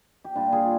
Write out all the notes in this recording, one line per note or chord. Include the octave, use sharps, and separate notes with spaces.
G4
A#2 G3 A#3 D4 F4
F4 G#4